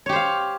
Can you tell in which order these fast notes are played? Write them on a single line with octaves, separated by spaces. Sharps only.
C#5 G4 C5 F5